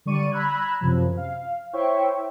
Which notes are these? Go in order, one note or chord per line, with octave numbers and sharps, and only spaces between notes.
D3 G3 D5 C#6 D#7
A#5 B5 E6 F#6 G#6
F#2 C3 F3
F5
E4 C5 C#5 E5 G5 C#6